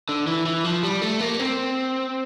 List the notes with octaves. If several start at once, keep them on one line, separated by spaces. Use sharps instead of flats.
D3
E3
E3
F3
G3
A3
A#3
C4